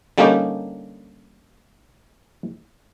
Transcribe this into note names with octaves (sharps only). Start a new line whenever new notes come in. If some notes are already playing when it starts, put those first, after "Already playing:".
D3 G3 A#3 C#4 D#4 G4